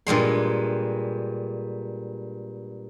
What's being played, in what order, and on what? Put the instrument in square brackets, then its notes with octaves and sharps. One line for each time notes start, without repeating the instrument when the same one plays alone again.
[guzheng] G2 A#2 G#3 C6